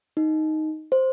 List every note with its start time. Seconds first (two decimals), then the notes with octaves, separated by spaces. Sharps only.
0.17 D#4
0.92 C5